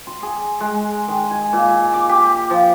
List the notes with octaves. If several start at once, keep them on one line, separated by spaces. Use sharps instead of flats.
C6
G#4
G#3
D#3
G#5
A#2
D6
G4
F3